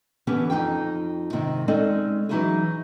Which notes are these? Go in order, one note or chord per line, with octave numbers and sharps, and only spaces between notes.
D3 E3 B3 C#4 G4
F2 D#4 F4 G5
G#2 C3 D#3 C4
G#3 C4 C#4 D#4 A4 D5
E3 F#3 D#4 E4 F#4 G#4